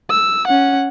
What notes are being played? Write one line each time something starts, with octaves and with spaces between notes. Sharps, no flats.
E6
C#4 F#5